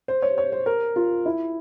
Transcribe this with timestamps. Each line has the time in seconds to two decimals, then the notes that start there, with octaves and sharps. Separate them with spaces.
0.08 C5
0.22 C#5
0.38 C#5
0.52 C5
0.66 A#4
0.96 F4
1.26 E4